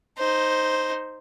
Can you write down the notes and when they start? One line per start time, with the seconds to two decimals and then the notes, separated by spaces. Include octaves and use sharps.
0.18 D#4 C5